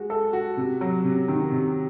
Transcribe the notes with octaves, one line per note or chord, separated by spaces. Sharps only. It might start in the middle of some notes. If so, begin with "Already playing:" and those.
Already playing: G#3 F#4
A4
F#4
C3
F#3
C3
D#3
C3